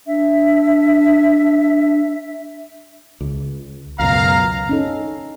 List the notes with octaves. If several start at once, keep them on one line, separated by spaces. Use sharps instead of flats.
D4 E5
C#2
C#2 F#2 B2 F5 A#5
C#4 D#4 A4